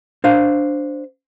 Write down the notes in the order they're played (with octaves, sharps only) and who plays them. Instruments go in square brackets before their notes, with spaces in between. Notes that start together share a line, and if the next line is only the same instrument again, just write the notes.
[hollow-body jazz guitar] D4 C5 F5